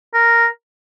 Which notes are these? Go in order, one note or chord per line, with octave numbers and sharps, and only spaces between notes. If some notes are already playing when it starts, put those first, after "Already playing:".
A#4